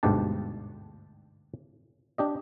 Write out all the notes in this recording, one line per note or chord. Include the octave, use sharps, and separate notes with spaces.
G1 D2 G#2 B2 G4 A5
D4 G4 D#5